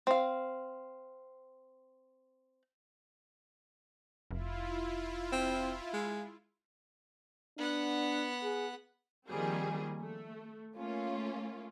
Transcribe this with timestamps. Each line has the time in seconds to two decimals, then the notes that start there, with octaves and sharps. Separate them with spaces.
0.07 C4 F5
4.31 F1 E4 F4
5.32 C4
5.93 G#3
7.58 B3 D4 F#5
8.43 G#4
9.28 D#3 F3 G3 A#3 C4 G#4
10.02 A3
10.76 A3 A#3 C#4 F4